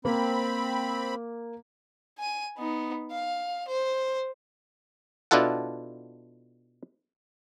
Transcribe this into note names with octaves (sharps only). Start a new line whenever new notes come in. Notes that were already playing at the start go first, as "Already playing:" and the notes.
A#3 C4 B5
G#5 D#7
B3 D#4
F5
C5
B2 D4 E4 F4 A4 F#5